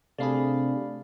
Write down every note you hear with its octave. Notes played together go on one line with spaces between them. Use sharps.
C3 A3 D4 G#4 D5 F5 B5